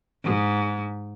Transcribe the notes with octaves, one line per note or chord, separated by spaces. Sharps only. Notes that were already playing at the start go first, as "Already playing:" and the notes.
G#2